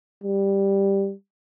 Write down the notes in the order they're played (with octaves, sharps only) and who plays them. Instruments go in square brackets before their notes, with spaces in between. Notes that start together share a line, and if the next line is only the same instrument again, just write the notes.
[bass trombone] G3